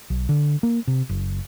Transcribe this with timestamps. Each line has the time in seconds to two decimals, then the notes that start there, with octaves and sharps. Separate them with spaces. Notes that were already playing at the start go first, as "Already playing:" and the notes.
0.10 B1
0.29 D3
0.63 A#3
0.88 C3
1.09 F#1